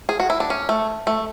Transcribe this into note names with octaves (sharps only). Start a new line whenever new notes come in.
G#4
F#4
E4
D4
C#4
A3
A3